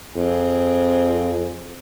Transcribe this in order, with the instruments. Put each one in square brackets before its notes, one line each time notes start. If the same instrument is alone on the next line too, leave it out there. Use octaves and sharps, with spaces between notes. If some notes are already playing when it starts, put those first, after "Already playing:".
[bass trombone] F2 [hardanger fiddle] C4 G#4